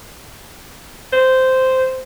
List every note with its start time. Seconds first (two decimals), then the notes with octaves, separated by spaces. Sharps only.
1.12 C5